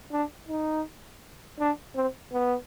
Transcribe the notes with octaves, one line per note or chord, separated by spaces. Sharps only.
D4
D#4
D4
C4
B3